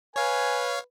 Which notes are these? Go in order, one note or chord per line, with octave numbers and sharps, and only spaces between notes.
B4 C#5 F5 G#5